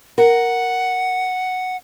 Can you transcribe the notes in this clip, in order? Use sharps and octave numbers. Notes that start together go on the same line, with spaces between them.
A#4 F#5